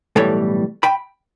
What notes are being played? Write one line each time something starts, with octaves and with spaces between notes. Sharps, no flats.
B1 A2 E3 G3 A4 C#5
G5 B5